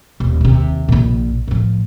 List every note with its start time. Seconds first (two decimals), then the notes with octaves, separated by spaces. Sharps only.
0.20 D#1
0.41 D#2 C3
0.88 A#1 A#2
1.48 A2 F3